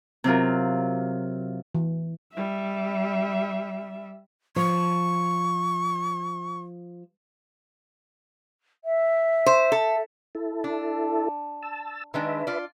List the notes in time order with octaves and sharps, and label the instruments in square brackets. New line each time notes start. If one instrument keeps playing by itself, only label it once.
[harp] C3 F#3 F4 A#4
[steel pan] E3
[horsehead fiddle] G3 E5
[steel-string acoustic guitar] F3 [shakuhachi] C#6
[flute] E5
[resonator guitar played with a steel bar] C5
A4
[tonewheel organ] E4 A4
[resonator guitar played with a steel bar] D4
[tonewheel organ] A5 E6
[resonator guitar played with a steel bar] D#3 G#3 D4 [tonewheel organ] B4 E5
[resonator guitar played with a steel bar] F4 D5